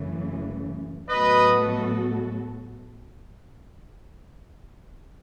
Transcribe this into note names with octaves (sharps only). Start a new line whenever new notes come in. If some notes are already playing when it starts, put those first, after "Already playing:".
Already playing: F#2 C#3 E3 A3
A2 F#3 B3 F#4 A4 B4 D#5